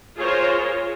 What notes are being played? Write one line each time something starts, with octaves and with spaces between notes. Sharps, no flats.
F4 G#4 A#4 C5 C#5